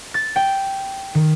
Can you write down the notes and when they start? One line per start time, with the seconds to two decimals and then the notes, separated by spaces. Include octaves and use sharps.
0.14 A6
0.36 G5
1.15 D#3